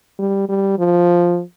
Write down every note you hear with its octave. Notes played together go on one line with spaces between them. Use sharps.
G3
G3
F3